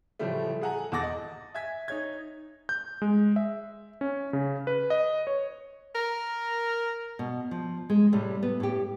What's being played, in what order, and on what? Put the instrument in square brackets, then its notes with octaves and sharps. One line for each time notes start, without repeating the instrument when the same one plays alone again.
[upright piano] A2 C#3 E3 F3 G3 A3
G#4 A4 F#5 G#5 A#5
E1 E2 F#5 D6 A6 A#6
D#5
E5 G#5 G#6 B6
D#4 C#5 G#6
[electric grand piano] G6
G#3
E5
C#4
C#3
B4
D#5
C#5
[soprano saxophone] A#4
[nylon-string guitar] B2
F3
G#3
A2 C3 G3
B3
A2 G4